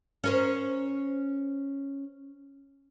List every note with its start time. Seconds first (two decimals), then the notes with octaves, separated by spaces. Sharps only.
0.24 C#4 A#4 C5